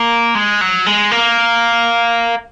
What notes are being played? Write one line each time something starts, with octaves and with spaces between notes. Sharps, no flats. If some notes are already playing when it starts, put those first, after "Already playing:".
Already playing: A#3
G#3
F#3
G#3
A#3